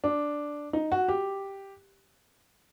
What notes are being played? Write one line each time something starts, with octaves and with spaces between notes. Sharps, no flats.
D4
D#4
F#4
G4